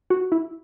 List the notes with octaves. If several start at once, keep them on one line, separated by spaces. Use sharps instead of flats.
F#4
E4